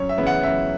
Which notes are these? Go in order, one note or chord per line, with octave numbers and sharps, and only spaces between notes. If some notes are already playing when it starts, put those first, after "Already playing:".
Already playing: F#2 C#5
E5
C#3 E3 B3 E4
F#5
F#2 E5